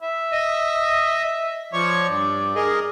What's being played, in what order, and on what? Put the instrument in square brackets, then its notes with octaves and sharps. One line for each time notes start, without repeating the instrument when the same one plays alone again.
[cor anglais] E5
[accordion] D#5
[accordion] F3 C#5 C#6 [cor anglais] D5
[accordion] G2
G#4 A#4 D#5